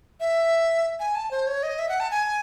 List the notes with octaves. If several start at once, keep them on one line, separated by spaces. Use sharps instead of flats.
E5
G#5
A5
C5
C#5
D#5
E5
F#5
A5
G#5